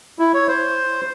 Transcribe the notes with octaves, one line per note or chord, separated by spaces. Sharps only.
E4
C#5
C5